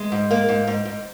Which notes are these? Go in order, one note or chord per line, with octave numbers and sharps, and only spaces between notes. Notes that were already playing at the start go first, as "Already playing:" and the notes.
Already playing: G#3
G#2
A#3
G#2
G#2
G#2